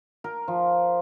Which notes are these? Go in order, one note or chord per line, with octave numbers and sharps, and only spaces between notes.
A#4
F3